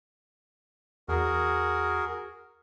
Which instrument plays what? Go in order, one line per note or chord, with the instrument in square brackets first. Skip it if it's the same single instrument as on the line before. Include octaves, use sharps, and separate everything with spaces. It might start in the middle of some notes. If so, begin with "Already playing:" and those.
[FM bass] E2 [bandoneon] F#4 G#4 A#4